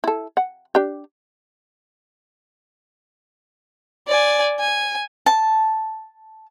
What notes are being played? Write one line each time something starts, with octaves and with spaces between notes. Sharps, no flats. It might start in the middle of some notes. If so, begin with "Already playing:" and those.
E4 A4
F#5
D4 G4
D5 G#5
G#5
A5